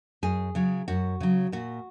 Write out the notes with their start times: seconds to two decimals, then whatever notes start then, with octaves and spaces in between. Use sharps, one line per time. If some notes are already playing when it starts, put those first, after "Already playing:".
0.23 F#2 G#4
0.55 C#3 F#3
0.88 F#2 F#4
1.20 C#3 F#3
1.52 A#2 F#4